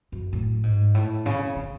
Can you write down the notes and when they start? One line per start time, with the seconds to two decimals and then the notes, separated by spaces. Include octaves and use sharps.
0.12 F#2
0.33 A2
0.63 G#2
0.94 A2
1.26 C#3
1.56 C#3